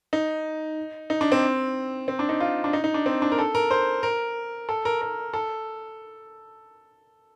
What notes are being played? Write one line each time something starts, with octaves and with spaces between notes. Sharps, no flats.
D#4
D#4
D4
C4
C4
D4
D#4
F4
D4
D#4
D#4
D4
C4
D4
A#4
A4
A#4
C5
A#4
A4
A#4
A#4
A4